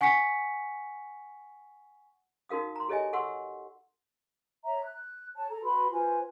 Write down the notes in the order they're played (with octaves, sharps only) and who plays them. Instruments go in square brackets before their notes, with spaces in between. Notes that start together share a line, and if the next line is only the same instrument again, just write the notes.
[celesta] F#5 G#5 C#6 B6 C#7
[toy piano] D#4 F#4 A#4 F5 D#6
A#5 C6
G4 A4 C#5 D#5 E5 G#5
A4 E5 F#5 C6 C#6 E6
[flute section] C#5 E5 A#5
F#6
C#5 A5
A4 A#5
F#4 B4 B5 C6
F4 B4 C5 G#5